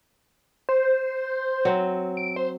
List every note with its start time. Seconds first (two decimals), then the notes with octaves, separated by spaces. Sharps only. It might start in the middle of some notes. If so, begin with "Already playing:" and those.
0.69 C5
1.65 F#3 C4
2.17 D7
2.36 C5